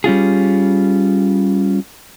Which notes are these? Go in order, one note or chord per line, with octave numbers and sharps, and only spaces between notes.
G3 C#4 F4 G#4